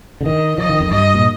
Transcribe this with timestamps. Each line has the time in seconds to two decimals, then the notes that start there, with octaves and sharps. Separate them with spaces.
0.21 D3
0.25 D#3 D#5
0.58 F3 D#5
0.69 D#3
0.80 F2
0.91 G2 D#5
1.14 A#2